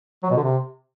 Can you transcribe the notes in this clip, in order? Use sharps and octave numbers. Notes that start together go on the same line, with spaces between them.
F#3
B2
D3
C3